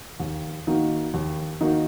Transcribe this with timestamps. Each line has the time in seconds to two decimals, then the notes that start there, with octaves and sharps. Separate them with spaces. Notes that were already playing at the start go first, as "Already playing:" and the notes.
0.20 D#2
0.67 D#3 A#3 D#4 F#4
1.14 D#2
1.61 D#3 A#3 D#4 F#4